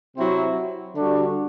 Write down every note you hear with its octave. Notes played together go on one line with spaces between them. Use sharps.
C3 F#3 C4 E4
D3 G3 D4 F#4